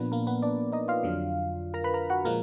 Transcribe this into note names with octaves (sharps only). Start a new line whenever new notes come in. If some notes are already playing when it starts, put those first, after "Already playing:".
Already playing: A#2 F3 A#3 B3 D4 B4
A#3 A#4
B3 B4
D4 D5
D#4 D#5
F4 F5
F2 D3 F#3 D4
A#4 A#5
B4 B5
A#4 A#5
F#4 F#5
A#2 F3 G#3 A#3 A#4